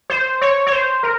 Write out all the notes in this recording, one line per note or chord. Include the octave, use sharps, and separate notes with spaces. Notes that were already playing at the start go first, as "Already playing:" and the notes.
C5
C#5
C#5
C5
A#4